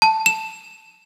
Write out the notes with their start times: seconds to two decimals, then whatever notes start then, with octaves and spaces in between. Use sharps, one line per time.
0.02 A5
0.26 E7